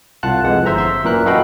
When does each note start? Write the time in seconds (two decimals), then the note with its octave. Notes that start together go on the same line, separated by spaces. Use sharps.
0.23 C2 F4 F#5 A5 F#6
0.44 F2 E3 G#3 F#5
0.66 G1 C5 E5 A#5
0.78 E5 C6
1.03 F#2 A#2 E3 A#4 F#6
1.26 F#4 A4 D#5 F5 G5 B5